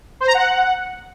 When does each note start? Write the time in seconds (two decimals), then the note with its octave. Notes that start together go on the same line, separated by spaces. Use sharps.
0.20 C5
0.27 A#5
0.34 F#5